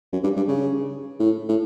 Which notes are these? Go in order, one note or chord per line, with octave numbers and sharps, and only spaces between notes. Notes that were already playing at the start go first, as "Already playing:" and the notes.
F#2
G2
G2
C#3
A2
A2